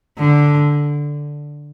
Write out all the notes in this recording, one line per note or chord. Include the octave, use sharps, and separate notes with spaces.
D3